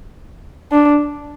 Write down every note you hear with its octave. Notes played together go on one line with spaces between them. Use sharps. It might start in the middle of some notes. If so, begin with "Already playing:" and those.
D4